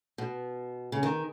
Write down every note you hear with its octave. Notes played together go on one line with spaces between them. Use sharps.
B2
C#3
D#3